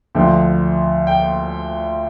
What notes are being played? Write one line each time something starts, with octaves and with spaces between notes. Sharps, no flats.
D2 D3 F3 G5
G5